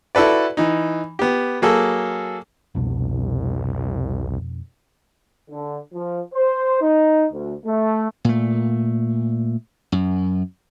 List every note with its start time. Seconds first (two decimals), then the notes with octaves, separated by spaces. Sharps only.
0.15 E4 F#4 A4 B4 D5
0.57 E3 D#4
1.19 B3 G4
1.62 F#3 A#3 G#4 A4
2.75 C2 F2 B2 D4
5.50 D3
5.94 F3
6.34 C5
6.82 D#4
7.32 D2
7.65 A3
8.25 A#2 A3
9.92 F#2